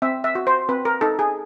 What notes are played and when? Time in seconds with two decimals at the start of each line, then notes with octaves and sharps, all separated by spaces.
0.02 C4 E5
0.24 E5
0.35 F#4
0.47 C5
0.69 C4 B4
0.85 A#4
1.01 D#4 A4
1.19 G#4